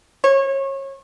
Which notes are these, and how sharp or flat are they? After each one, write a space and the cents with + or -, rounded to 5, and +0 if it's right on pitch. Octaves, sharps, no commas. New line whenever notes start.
C#5 -30